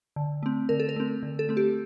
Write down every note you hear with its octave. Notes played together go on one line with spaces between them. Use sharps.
D3
A3 C4
D3 A#4
A4
A#4
A3 C4
D3
A4
A3 C4
G4